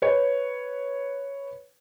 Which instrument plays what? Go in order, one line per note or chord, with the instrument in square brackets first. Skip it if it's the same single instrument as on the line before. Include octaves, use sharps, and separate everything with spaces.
[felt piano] B4 C#5